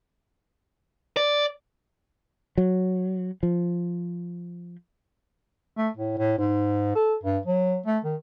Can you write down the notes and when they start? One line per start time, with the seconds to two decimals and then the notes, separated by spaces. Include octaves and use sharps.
1.17 D5
2.58 F#3
3.43 F3
5.77 A3
5.97 A2
6.18 A2
6.38 G#2
6.95 A4
7.23 G2
7.46 F#3
7.86 A3
8.05 D#3